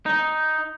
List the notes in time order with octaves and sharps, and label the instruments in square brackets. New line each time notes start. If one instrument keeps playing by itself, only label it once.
[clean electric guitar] D#4